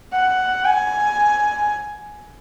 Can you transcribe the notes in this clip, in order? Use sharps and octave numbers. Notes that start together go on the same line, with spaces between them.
F#5
G#5